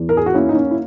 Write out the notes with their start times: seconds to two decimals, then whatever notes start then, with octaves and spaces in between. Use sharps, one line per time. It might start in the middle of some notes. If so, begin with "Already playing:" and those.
Already playing: E2
0.09 A#4
0.17 G#4
0.26 F#4
0.34 A#3 C#4 E4
0.49 D#4
0.55 C#4
0.71 E4